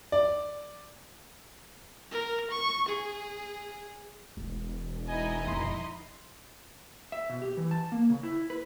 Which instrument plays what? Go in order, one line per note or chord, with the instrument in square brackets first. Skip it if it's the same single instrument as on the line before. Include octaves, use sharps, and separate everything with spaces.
[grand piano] D5
[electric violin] A#4
C#6
G#4
[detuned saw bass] E1 [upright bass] G#3
[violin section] D#4 E4 D#5 [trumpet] G#5
[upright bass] D#1 F2 [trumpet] C6
[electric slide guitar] E5
B2
G4
E3
A5
A#3
C#3
E4
B4